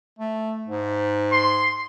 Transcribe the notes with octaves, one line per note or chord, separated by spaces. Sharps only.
A3
G#2
C6